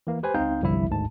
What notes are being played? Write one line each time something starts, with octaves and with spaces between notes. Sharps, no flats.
E3 A#3
G4 B4 C5 G#5
C#2 C4 D#4 F5 G6
G1 C2 F3 E4 E5
G#1 D2 G#2 A5